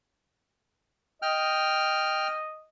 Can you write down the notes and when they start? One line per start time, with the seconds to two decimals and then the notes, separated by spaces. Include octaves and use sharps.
1.22 D#5 G5 F6